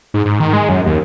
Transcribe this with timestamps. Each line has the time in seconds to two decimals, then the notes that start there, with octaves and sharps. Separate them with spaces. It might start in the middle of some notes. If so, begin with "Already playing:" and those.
0.14 G#2
0.25 G#2
0.40 D#3
0.53 G#3
0.69 F#2
0.86 D#2